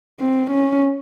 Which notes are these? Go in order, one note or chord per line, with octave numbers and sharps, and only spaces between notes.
C4
C#4